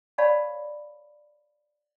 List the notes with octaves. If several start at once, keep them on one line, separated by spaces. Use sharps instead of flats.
C#5 D5 F5 A5 B5 C#6